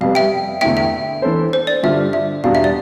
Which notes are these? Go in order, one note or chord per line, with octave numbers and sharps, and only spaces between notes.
F2 C3 G3 B3 F5
E5 G5
E2 D3 A3 E4 E5 G5
E5
E3 B3 D4 A4 C5
C5
D5
G2 D3 G3 D4 F4 E5
E5
E2 B2 G3 D4 F5
E5
D5